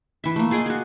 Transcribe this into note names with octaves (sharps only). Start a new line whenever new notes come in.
E3 E5
A3 A#3
F4 G#4 D5 D#5
F#4 G#4